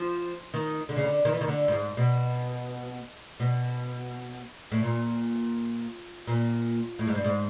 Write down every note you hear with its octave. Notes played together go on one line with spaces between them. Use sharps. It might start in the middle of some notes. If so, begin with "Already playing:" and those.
Already playing: F3
D#3
D3
C#3
D3
D#3
E3
D#3
D3
G2
G#2
B2
B2
A2
A#2
A#2
A2
G#2
G2
G#2